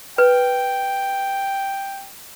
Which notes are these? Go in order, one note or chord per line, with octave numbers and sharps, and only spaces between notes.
B4 G5